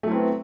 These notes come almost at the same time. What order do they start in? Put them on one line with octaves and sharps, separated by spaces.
A3 F#3 E4 C4 B3